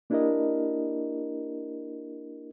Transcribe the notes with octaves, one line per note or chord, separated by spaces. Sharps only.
A#3 D4 E4 G4 A#4 D#5